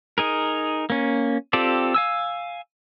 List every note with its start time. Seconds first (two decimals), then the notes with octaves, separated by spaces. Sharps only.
0.18 D#4 G#4 A#4
0.90 A#3 C#4
1.53 C4 F4 G4 A4 D5
1.94 F5 G#5 E6